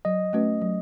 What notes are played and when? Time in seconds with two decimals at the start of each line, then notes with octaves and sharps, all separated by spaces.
0.05 F#3 D#5
0.33 A3 C#4 F#4 B4
0.62 F#3